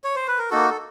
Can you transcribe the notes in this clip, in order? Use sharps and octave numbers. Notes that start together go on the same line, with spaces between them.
C#5
C5
B4
A#4
A#3 D#4 F#4 A4
A4